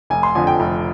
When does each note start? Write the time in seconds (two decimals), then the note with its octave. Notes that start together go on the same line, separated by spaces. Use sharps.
0.10 F1 G#5
0.23 C6
0.35 F2 D3 F3 G#5
0.47 G5
0.60 F1